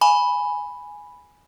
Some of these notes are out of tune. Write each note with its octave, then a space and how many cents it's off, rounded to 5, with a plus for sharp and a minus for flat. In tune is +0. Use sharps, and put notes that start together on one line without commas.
G#5 +0 B5 +0